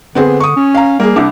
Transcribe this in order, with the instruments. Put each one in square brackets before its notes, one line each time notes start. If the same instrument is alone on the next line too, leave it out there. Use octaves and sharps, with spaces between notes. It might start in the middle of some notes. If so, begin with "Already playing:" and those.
[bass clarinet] D3 [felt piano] B3 C4 G#4
[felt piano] C#6 D#6
[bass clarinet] C#4
[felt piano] F5 A#5
[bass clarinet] G3 [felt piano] A#3 G#4
[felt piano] C2 D6 [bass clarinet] D4